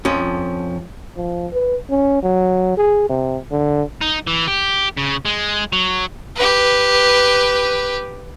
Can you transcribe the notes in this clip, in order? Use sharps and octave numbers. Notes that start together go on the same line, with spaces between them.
F2 F3 C#4
F3
B4
C#4
F#3
G#4
C3
D3
D#4
E3
G4
C#3
G#3
F#3
G4 B4